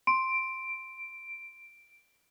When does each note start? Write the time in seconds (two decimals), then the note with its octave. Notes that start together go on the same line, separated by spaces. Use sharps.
0.07 C6 D7